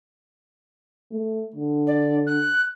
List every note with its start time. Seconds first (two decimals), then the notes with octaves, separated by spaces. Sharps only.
1.12 A3
1.56 D3
1.87 D5
2.27 F#6